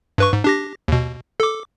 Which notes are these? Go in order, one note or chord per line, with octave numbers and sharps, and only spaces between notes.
G2 B4 C#6
G#2
D4 G4 A#6
D#2 B2
A4 D6